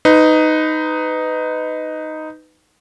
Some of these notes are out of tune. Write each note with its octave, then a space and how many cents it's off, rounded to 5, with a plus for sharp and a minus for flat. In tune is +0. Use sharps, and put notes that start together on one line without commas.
D#4 +0 B4 +25